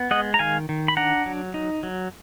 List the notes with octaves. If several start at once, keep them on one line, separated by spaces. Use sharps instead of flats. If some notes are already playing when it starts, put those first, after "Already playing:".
Already playing: B3
G#3 D#5 F#5
A#5
D#3 F5 G#5
D#3
B5
D4 F#5 A#5
F#3
D#4
F#3